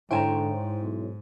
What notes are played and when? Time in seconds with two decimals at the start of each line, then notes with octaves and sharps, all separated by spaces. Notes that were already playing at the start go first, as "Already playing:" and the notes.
0.11 G#2 D3 E4 C5 C#5 G5 G#5 A#5
0.82 B1